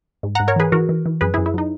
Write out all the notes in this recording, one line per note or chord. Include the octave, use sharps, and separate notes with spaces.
G#2
G#2 F#5 A#5
A#4 C#5
E3 G#4 B4
E3 F#4 A#4
E3
E3
F#2 G#4 B4
F#2 E4 G#4
E4
F#3 D#4